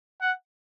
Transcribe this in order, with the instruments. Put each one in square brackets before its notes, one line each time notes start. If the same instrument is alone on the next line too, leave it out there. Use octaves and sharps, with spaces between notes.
[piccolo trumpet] F#5